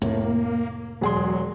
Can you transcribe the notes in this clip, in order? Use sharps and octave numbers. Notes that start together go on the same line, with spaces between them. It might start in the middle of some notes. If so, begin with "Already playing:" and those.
F1 A2 A#3
E1 F#3 G#4 C6